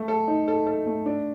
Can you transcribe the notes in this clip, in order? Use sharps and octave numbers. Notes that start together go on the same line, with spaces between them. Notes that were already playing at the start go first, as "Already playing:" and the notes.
Already playing: A3
A4
D#4
A4
A4
A3
D4